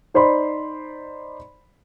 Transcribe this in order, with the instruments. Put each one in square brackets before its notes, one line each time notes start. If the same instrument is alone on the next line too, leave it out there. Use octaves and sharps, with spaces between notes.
[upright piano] D#4 C5 D5 B5 C6